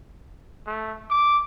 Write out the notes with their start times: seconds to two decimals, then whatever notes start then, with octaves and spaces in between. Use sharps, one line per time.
0.66 A3
1.10 D6